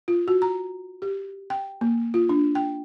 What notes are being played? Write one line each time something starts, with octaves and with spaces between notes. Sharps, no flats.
F4
F#4
A#5
G4
G5
A#3
F4
D4
G5